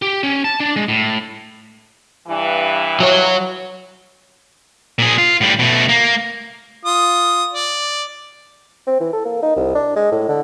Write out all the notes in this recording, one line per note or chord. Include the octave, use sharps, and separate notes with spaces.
G4
C#4
A5
D4
G#3
A2
G2 E3
F#3 C#5
A#2 G#4
F4
A2 G3
B2 A3
A#3
F4 D#6
D5
C4
E3
A4
A#3
D#4
C2
D4
G#3
A2
D3